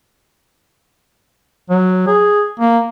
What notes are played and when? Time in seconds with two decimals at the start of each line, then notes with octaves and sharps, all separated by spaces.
1.70 F#3
2.07 G#4
2.59 A#3